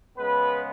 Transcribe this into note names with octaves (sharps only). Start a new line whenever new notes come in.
C#3 G#3 B3 B4